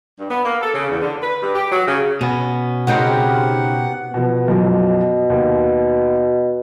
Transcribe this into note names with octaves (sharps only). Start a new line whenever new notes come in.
G2
B3
A#3
A4
C#3
E2
D3
B4
G2
G4
F#3
C#3
B2 B3 C#4
C#3 C4 D#4 F#4 G4 A#4 F#5
B2 F3 B3
B1 F#2 B2 F3
D#2